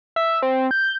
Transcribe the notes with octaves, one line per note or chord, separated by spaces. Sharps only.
E5
C4
G6